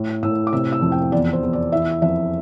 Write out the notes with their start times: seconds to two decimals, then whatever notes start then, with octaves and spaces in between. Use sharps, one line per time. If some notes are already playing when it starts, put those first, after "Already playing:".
Already playing: A2
0.23 A2 E6
0.47 D6
0.53 C3 E6
0.73 E6
0.82 F2
0.92 G5
1.12 E2 D5
1.33 C5
1.43 E2
1.53 D5
1.72 E3 E5
2.02 F2 E5